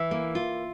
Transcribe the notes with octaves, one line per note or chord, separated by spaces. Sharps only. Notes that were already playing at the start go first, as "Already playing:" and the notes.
Already playing: E3 E5
A#3
F4